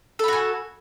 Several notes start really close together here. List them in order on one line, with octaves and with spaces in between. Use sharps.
A4 B5 F#4 G#5